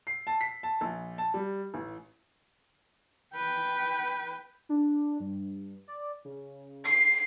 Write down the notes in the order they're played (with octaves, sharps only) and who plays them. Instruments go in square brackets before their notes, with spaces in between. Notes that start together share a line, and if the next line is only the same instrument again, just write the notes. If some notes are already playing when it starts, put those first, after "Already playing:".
[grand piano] C7
A5
B6
A5
A#1
A5
G3
A1
[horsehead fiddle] B4 G5
[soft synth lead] D4
G2
D5
C#3
[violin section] C7